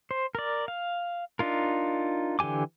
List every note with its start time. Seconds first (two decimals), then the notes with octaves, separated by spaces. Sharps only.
0.11 C5
0.35 A#4 D5
0.68 F5
1.39 D4 D#4 F4 A#4
2.39 D3 E3 G4 G#5 D6